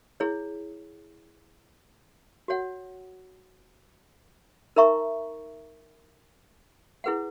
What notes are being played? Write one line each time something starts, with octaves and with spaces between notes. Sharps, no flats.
E4 G#4 C#5
F#4 C#5 F#5
D#4 A#4 E5 A#5 C#6
E4 G#4 B4 F#5